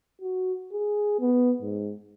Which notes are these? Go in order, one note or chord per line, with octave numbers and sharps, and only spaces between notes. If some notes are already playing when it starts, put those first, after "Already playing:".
F#4
G#4
B3
G#2